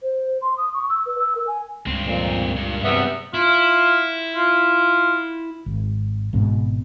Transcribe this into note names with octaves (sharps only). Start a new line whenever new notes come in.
C5
C6
D#6
C#6
E6
B4
E6
A#4
G#5
C#2 G2 C4
F2 A#2
G2 A#2
G2 C3 F#3 G3 B3 E5
E4 F4
F4
G#1
G#1 G#2 B2